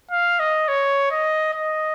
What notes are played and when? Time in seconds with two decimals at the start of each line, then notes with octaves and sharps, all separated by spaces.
0.11 F5
0.40 D#5
0.68 C#5
1.11 D#5
1.53 D#5